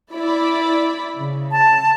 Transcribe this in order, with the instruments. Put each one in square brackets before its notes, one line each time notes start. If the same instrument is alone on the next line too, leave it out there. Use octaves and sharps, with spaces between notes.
[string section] E4 D5 B5
C#3
[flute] A5